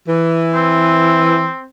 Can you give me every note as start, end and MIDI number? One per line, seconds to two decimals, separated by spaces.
0.08 1.49 52
0.54 1.65 60